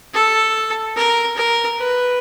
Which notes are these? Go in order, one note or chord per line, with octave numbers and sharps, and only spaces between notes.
A4
A#4
A#4
B4